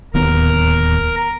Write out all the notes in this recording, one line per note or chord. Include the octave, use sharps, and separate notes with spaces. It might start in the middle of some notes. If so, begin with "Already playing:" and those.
D1 D#2 B3 A#4